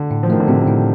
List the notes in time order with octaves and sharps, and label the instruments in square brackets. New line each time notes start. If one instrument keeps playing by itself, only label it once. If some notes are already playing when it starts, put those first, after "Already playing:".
Already playing: [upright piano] D3
[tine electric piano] A2
[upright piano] F3
[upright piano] D#3 [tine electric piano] A3
[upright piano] D3
[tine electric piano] A2 [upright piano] C3
[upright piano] D#3
[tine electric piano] A2